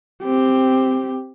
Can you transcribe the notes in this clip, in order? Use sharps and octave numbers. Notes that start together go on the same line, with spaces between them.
C4 G4